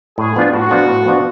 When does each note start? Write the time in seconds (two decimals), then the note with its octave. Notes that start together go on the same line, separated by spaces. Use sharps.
0.18 A2 G#4
0.36 F3 B3 D4 F4
0.53 A2 F#4
0.70 F3 B3 D4 F4
0.88 A2
1.05 F3 B3 D4 F4